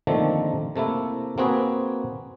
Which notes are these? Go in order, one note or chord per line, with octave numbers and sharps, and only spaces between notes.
D3 D#3 F3 A3 A#3 C4
C3 A3 A#3 E4
A#3 C4 F#4 G#4 B4